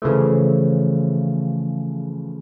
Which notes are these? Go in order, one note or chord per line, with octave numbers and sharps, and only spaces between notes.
C#3 E3 F3 A3